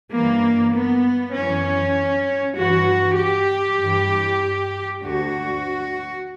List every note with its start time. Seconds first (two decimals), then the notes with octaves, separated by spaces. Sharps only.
0.14 G2 E3 A#3
0.75 B3
1.36 F#2 E3 C#4
2.58 G2 E3 F#4
3.20 G4
3.81 G2 E3
5.02 D2 D3 F#4